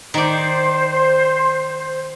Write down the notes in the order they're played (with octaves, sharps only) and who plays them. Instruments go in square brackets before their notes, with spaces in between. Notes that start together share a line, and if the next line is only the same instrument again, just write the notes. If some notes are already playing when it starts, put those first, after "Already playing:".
[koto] D#3 D5 [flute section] C5